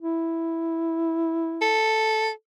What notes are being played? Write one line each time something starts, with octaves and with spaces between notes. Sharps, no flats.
E4
A4